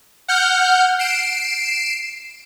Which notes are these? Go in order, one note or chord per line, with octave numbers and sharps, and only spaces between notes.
F#5 F6 G6
C7 D7 E7